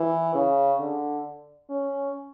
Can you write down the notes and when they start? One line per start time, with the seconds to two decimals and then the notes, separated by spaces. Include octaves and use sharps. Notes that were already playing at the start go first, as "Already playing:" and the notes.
Already playing: E3
0.34 C#3
0.80 D3
1.69 C#4